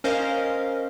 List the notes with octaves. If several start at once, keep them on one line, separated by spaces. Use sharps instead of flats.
C#4 A#4 C5 D#5 F5